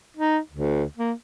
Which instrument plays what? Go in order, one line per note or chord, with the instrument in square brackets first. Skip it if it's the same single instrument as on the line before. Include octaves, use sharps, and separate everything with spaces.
[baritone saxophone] D#4
D2
A#3